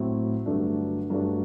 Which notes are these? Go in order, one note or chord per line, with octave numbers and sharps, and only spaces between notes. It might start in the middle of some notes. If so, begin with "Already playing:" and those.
Already playing: A2 F#3 C4
G2 D3 F#3 A3 D4
G2 F#3 A3 D4